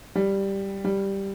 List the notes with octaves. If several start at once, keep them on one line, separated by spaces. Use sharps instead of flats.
G3
G3